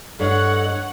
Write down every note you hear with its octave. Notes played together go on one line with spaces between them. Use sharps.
G2 A4 C#5 D#5 F#5